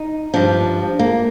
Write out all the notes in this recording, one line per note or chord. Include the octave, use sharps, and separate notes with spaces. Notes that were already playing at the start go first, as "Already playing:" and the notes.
Already playing: D#4
G2 F3 D4
A#3